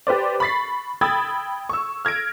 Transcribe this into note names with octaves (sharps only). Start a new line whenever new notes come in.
G4 B4 C5 D5
B5 C#6 A6 B6 C7
G5 B5 D#6 E6 G#6 A6
C#6 E6
F6 G#6 A#6 D7